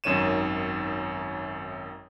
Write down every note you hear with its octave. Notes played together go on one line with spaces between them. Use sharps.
G#1 F#2 D#3 C#5 D#7 E7